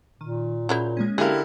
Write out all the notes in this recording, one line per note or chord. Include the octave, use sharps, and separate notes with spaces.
A#2 D#3
A#2 C#3 F#3 E4 A#4 G6
G#3 A#3 C#4
D3 E4 G4 G#4 A#4 F5